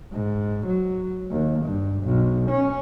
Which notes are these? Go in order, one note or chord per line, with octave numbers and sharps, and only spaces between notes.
G#2
F#3
D#2
G2
B1
C#4